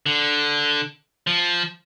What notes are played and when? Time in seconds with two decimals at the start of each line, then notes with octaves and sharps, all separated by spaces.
0.06 D3
1.27 F3